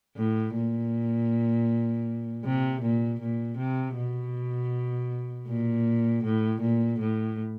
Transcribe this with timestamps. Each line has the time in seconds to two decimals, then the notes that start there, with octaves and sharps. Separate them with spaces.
0.17 A2
0.56 A#2
2.44 C3
2.82 A#2
3.20 A#2
3.58 C3
3.96 B2
5.47 A#2
6.24 A2
6.61 A#2
7.00 A2